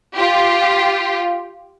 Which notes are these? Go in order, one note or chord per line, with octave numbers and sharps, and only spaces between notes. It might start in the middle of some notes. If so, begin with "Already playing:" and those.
F4 G4